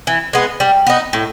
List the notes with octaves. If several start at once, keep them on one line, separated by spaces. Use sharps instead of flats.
E3
G#3 B3
G3
B3 D#4
A2